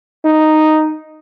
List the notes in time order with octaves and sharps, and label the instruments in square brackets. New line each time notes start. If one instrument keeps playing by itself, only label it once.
[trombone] D#4